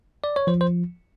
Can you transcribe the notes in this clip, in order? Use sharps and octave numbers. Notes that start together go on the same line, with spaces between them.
D5
C#5
F3 C5
C5